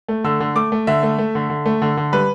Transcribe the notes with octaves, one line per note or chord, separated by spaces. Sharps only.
A3
D3 E6
D3
A3 D6
A3
D3 E5
A3
A3
D3
D3
A3
D3
D3
G3 B4